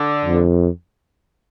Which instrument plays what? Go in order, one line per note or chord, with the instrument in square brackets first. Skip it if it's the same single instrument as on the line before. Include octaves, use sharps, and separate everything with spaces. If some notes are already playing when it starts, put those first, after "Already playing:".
Already playing: [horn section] D3
[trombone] F2